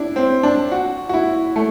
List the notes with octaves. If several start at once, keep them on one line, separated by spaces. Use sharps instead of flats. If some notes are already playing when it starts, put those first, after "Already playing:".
Already playing: D4 E4
C4
D4
F#4
F#4
E4
A3